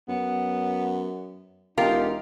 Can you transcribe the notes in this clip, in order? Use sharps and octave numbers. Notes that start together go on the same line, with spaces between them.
F#2 B3
E1 D#4 F4 G4 A#4